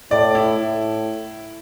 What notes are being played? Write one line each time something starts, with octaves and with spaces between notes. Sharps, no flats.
A2 D5
E4
A2